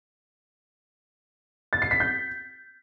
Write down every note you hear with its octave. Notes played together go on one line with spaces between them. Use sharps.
A6
C7
B6
G6